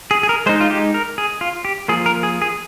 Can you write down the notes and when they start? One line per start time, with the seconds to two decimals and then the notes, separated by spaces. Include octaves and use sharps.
0.11 G#4
0.23 G#4
0.29 A#4
0.46 G#3 D#4 C5
0.60 F4
0.70 G4
0.94 A#4
1.18 G#4
1.41 F4
1.65 G4
1.88 F3 A#3 F4 G#4
2.06 A#4
2.23 G#4
2.42 G#4